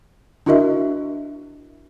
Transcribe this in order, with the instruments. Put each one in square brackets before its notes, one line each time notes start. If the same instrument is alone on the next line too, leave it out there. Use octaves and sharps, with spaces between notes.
[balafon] D4 E4 F#4 A#4 D#5 E5